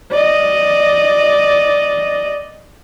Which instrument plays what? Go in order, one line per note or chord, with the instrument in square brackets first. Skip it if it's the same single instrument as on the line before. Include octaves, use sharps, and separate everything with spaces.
[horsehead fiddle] D5 D#5